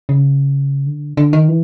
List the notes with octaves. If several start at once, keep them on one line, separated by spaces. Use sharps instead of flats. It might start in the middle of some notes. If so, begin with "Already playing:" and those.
C#3
D3
D3
D#3
E3